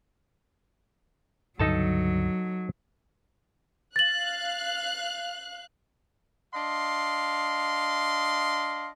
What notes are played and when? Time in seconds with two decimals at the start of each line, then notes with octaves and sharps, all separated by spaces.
1.60 C#2 G2 D3 F#3 D#4 A4 A5
3.96 F5 F#6 A6 F#7
6.54 D4 D#5 F5 C6